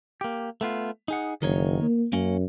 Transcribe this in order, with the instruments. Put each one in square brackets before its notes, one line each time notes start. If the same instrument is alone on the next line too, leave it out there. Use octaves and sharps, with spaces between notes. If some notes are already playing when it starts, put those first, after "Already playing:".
[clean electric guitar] A#3 G4
A3 B3 F4
D#4 G#4 F#5
[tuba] F#1 [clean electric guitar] D#3 D#4 C#5
[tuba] A#3
[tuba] F#2 [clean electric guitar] A#3 C#4